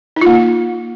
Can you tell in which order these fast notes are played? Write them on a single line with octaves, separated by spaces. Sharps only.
D#4 F4 A#3